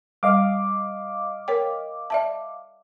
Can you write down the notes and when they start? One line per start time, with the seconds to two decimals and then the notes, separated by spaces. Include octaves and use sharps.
0.23 G3 D#5 F5 D6
1.48 A#4 C#5 G5
2.10 D5 E5 A5